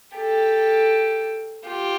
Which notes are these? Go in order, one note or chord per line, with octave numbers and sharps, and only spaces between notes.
G4 A4
F4 G4